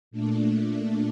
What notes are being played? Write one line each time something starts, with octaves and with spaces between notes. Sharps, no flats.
A#2 A3 D4